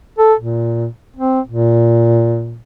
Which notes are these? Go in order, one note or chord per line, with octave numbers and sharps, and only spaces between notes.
A4
A#2
C4
A#2